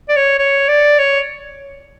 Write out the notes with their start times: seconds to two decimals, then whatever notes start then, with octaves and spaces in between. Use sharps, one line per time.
0.09 D5
0.16 C#5
0.39 C#5
0.68 D5
0.98 C#5